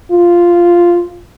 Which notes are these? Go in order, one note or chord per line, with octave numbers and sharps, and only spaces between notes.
F4